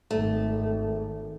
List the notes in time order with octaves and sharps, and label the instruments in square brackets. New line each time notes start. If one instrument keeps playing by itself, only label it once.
[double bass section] G#1 [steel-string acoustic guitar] A3